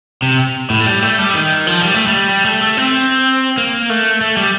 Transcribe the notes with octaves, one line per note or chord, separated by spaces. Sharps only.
C3
A2
A3
G3
A3
G3
D#3
F3
G3
A3
G3
G3
A3
A3
C4
A#3
A3
A3
G3